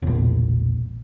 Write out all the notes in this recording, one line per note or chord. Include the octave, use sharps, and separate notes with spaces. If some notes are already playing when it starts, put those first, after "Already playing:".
E1 A#1